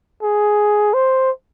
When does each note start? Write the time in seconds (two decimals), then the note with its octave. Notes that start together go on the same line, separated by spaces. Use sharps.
0.23 G#4
0.94 C5